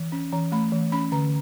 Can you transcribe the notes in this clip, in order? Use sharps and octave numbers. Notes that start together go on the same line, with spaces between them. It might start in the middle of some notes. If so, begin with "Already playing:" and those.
Already playing: E3
C#4
E3 A#5
A3 B5
E3
C#4 B5
D3 A#5